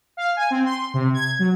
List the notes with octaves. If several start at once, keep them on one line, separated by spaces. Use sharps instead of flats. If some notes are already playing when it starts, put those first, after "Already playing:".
F5
G#5
C4
C6
C3
G#6
F#3